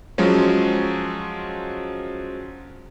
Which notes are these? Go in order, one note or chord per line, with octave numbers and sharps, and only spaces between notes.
F3 F#3 G#3 C#4